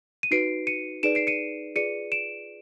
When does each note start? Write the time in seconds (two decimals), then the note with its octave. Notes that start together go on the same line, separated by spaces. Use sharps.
0.23 D#7
0.31 D#4 F#4 B4 C7 D7
0.67 C#7 D#7
1.03 D#4 G#4 B4 D5 D7 E7
1.15 C7 D7
1.27 C#7 D#7
1.75 F4 G#4 B4 D5 C#7 D#7
2.12 D7 E7